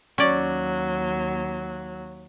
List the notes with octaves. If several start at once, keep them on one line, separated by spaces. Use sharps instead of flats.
D#2 F#3 C#4 D5